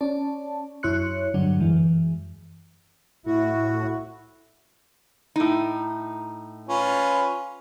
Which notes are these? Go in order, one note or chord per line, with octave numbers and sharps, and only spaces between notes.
C#4 D5 A5
F#2 E4 C#5 C6 F#6 C#7
G2 D3 F#3 D4
F#2 E3 G#3
A2 E4 F#4
A2 D#4
C#4 F4 B4